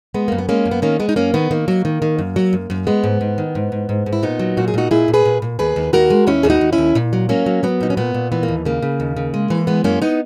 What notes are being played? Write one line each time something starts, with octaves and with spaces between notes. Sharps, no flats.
G#3 B3
F#2 A#3
B3
G#3 A#3 C#4
F#2
B3
D#3 A#3 C#4
G#3 B3
D#4
F#2 A#3 C#4
D#3 B3
D#3 A#3
F#3
D#3
D#3
F#2
F#3
F#2
F#2
G#3 B3
G#2
G#2
D#3
G#2
G#2
G#2
G#2
E4
A#2 B3 D#4
F#3
A#2 F#4
G#4
A#2 D#4 F#4
A#2 E4 G#4
A#2
G#4 B4
A#2
A#2
D#2 G#4 B4
D#2
D#2 F#4 A#4
G#3
D#2 C#4 E4
D#2 G#4
D#4 F#4
D#2
C#4 E4
D#2
A#2
F#3
F#3 A#3 C#4
F#3
F#3 B3
A#2 D#4
C#4
A#2 B3
A#2
E3 B3
A#3
D#2
C#3 A#3
C#3
D#2
C#3
G#3
E3
G#3 B3
F#2 A#3 C#4
B3 D#4